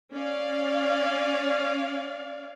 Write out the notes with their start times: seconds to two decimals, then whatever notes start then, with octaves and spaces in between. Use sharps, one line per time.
0.14 C#4 D5 F5